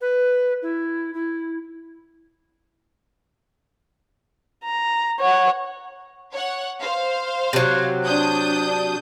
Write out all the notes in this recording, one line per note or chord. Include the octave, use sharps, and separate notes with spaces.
B4
E4
E4
A#5
C#5 F#5
C#5 F#5
C5 F5
C3 F#3
D4 D#6 G6